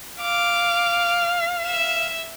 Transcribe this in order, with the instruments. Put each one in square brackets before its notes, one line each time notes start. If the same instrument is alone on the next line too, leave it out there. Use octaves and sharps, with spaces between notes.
[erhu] F5 [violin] D6
[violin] E5 E7